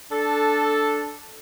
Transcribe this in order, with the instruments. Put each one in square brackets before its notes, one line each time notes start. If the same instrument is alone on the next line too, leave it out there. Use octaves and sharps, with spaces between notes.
[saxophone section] D4 A4